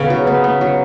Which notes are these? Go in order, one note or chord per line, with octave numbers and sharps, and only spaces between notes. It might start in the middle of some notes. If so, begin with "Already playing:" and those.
Already playing: C#3 B3
F#3
B3
B3
F#3